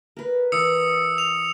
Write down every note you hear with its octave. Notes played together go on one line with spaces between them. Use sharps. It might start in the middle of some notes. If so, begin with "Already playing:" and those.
A#4 B4
E3 D#6 E6 C#7
F7